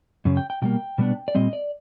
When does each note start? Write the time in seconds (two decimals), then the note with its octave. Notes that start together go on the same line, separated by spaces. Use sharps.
0.25 F#2 C#3
0.37 G5
0.50 G5
0.62 B2 G3 A#3 G5
0.98 B2 G3 B3 D4
1.28 D5
1.35 A#2 G3 C4 D#5
1.53 D5